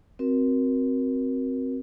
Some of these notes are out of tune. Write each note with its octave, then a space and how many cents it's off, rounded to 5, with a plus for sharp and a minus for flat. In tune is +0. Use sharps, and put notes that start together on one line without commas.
C4 +0 F#4 +0 A#4 +25